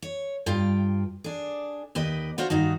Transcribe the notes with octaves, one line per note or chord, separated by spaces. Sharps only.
C#5
G2 F4 G5
D4 G#4
D#2 G4 B4 D#5
D4 F4 F#4 C5 C#5
G2 D#3 D#4 F#4